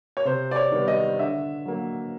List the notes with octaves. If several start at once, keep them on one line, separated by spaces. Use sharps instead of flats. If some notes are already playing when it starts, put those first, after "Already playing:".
C#5
C3 C5
D5
C#5
D#3 G3 B3
D#5
D3 E5
F#3 A#3